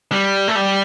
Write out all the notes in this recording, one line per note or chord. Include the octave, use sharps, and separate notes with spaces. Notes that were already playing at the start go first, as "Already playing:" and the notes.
G3
A3
G3